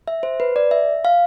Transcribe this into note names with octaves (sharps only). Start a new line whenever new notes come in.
E5
C5
B4
D5
E5
F5